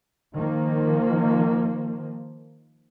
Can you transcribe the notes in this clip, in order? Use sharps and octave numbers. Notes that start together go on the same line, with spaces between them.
D#3 F3 A#3